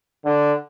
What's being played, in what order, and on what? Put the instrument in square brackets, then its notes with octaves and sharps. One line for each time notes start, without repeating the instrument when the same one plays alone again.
[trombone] D3